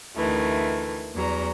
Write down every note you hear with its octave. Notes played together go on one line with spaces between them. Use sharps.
D2 D#3 E3 A3
E2 F#3 G3 A#5